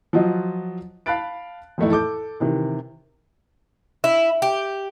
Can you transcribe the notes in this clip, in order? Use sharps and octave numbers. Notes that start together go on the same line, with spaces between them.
F3 F#3 F4 F#4 D#5
F5 A5 B5 F#6 A6 D7
F2 A2 E3 A3 D#4 E4
A4 D6 G6
C3 D#3 E3
E4
G4